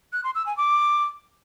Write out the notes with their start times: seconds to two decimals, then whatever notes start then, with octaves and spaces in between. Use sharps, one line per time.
0.13 F#6
0.24 C6
0.35 E6
0.46 G#5
0.57 D6